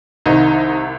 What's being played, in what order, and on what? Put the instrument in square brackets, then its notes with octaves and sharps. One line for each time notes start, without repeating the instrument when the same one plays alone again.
[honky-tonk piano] C2 C3 D#3 D#4